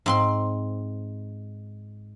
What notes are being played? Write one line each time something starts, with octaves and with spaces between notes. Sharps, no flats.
G#2 C4 C6